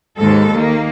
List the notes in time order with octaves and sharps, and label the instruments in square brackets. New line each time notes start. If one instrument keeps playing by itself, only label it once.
[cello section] D#2 G#2 G#3 A4
D#3 A#3